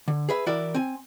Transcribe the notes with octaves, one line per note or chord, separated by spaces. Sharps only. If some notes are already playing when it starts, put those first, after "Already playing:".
D3
G#4 B4 E5
E3 E4 F#4 A#4 D5 E5
C4 G#5